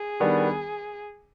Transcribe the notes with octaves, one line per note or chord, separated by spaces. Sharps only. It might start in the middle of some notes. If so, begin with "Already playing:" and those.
Already playing: G#4
D#3 G3 B3 D4